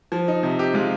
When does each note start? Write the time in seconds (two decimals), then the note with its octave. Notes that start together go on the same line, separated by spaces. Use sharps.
0.12 F3
0.28 D#4
0.43 C3
0.59 G4
0.74 G#3 F4